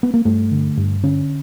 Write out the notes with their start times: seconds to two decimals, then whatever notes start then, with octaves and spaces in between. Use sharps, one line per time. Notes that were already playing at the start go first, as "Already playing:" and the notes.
0.03 B3
0.14 A#3
0.25 G2 A3
0.51 D3
0.77 G2
1.03 D3 C#4